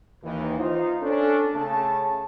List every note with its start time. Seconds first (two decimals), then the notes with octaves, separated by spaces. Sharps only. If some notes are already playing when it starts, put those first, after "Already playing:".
0.23 D#2 E3
0.59 D#4 F4 C5 F5
1.01 C#4 D4 A4
1.54 C#3 A3 C#4 A5